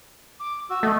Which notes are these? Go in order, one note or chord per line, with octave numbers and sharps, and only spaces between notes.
D6
F#4 E6
A3 A4 D#5